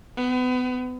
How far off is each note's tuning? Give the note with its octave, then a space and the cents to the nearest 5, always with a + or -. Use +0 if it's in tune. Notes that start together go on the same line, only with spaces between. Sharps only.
B3 +30